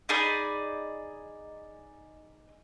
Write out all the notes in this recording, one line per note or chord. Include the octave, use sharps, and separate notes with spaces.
D#4 G#4 D5 B5